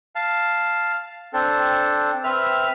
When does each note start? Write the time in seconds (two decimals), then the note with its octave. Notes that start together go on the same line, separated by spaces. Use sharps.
0.15 F5 A5
1.33 C4 D4 A4
2.24 C4 B4 E5 F6